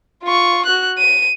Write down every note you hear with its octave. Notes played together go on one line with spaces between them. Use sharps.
F4 C#6
F#4 F#6
D#7